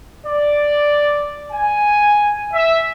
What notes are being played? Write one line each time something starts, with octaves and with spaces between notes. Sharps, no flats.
D5
G#5
E5